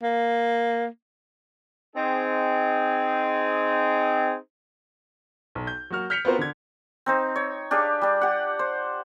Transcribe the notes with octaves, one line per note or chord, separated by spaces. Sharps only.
A#3
C4 D#4 G#4
B1
G6
F#3 A#3 F#4 F6
F6 G6 B6 C#7 F7
B3 C4 F4 F#4 A#4 C5
D3 G#6
C4 D#4 C5
C#5
D4 G4 G#4 F5
G3 D4
G4 F#5
C5